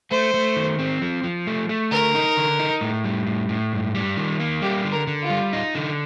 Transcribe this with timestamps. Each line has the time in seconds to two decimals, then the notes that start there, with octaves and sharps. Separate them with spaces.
0.11 A3 C5
0.34 A3
0.56 D#3
0.79 C4
1.02 F3
1.24 F3
1.47 A3
1.69 A3
1.91 D3 A#4
2.15 D#4
2.37 D3
2.60 D#4
2.81 A2
3.04 G3
3.27 A2
3.49 A2
3.73 G2
3.95 G3
4.17 D#3
4.40 A#3
4.62 G3 G4
4.85 D3
4.92 A#4
5.07 D3
5.23 F4
5.30 G3
5.53 D#4
5.75 D3